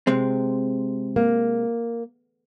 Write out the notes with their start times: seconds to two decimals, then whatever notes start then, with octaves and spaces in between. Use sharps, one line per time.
0.07 C3 G#3 C4
1.16 A#3